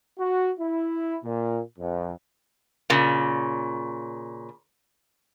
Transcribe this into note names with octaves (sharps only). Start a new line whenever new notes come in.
F#4
E4
A#2
F2
A#2 C#3